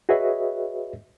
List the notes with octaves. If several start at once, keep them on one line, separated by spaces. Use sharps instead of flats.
F#4 G#4 B4 C#5 D#5 E5